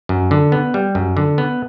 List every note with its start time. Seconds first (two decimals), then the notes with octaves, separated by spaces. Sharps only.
0.09 F#2
0.31 D3
0.52 B3
0.74 G3
0.95 F#2
1.17 D3
1.38 B3